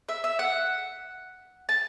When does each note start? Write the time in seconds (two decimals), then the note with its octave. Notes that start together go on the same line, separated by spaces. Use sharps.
0.09 E5
0.24 E5
0.39 F#5
1.69 A5